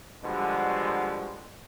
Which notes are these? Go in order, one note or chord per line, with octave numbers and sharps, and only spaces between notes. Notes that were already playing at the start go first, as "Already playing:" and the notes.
B2 D3 F3 G3 G#3